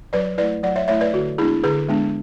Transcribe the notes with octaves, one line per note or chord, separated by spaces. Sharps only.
F#3 B4 D5
A3 E4 B4 D5
F#3 D5 F#5
C#5 E5
A3 E4 C#5 E5
B4 D5
D3 F#4
G#3 B3 D4 E4 G#4
D3 G#4 B4
G#3 B3 D4